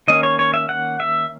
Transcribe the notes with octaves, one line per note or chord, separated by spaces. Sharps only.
D#3 A#3 C#4 D#5
C#5
C#5
E5
F#5
E5